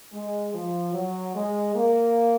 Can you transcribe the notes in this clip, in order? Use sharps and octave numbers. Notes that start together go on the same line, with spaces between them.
G#3
F3
F#3
G#3
A#3